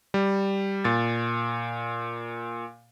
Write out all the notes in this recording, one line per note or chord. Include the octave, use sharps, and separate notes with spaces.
G3
A#2 A6